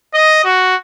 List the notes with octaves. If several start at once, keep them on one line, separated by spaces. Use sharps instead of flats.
D#5
F#4